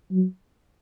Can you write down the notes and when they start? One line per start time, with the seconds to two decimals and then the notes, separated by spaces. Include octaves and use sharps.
0.11 F#3